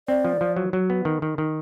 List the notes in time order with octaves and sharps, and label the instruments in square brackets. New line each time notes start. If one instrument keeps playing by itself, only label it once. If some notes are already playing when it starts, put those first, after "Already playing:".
[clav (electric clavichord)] C4 [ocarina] D5
[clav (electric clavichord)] F3
F3
F#3
F#3
B3
D#3
D#3
D#3